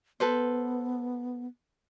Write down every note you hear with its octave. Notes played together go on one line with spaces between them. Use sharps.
B3 A4 B4 C5